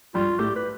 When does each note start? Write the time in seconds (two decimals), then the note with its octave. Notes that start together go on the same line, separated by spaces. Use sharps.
0.14 G2 G3 F4
0.39 A2 A3 G4
0.56 B4